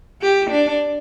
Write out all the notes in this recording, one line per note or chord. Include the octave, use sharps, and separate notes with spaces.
G4
D4